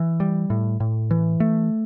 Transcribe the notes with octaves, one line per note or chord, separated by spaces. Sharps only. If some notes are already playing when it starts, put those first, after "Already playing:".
Already playing: E3
G3
A2
A2
E3
A3